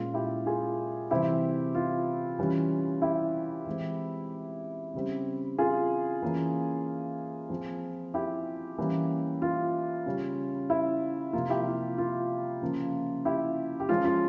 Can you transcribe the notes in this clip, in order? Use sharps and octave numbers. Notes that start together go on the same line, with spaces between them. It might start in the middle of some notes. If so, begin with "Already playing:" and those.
Already playing: A#2 G#3 C#4 F4
E4 G4
F4 G#4
C3 E3 G3 C4 E4 G4
F4
E3 G3 C#4
E4 G4
E3 G#3 C4
C#3 G3 C4
F4 G#4
E3 A#3 C#4
F3 C4
E4 G4
E3 G3 A#3 C#4
F4
C#3 G3 C#4
E4
C3 F3 A#3 F4
E4 G4
F4
F4
C#3 F3 A#3
E4 G4
G4
F3 G#3 C#4 F4
F4